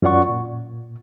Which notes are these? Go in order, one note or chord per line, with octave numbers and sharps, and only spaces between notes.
F#2 C#4 F4 D5 F#5 C#6
A#2